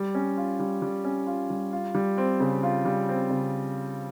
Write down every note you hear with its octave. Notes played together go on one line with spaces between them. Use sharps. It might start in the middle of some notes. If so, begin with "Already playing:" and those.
Already playing: G3
C#4
F4
G3
G3
C#4
F4
G3
F4
G3
C4
C#3
F4
G3
C4
C#3